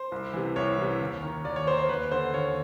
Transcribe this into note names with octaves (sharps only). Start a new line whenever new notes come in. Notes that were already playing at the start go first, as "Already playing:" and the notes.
Already playing: C5
C2
C3 E3
C2 C#5
C3 E3
D#2
D#3
D#2 D5
C#5
D#3 C5
C5
D#2 B4
D3 C5
D#2 C#5